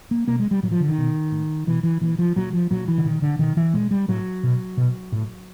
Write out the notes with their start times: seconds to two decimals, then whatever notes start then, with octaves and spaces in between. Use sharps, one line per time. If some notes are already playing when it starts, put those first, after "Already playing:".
0.11 A#3
0.28 B2 A#3
0.40 G#3
0.51 G3
0.63 A2 F#3
0.71 F3
0.80 D3
0.88 D#3
0.98 B2
1.31 A2
1.67 B2 E3
1.83 E3
2.01 A#2 E3
2.19 F3
2.36 A#2 F#3
2.53 F3
2.71 A#2 F#3
2.88 E3
2.98 D3
3.04 A#2 D#3
3.22 D3
3.39 B2 D#3
3.57 E3
3.74 A#2 G#3
3.91 G3
4.08 A2 F#3
4.43 B2
4.77 B2
5.12 A2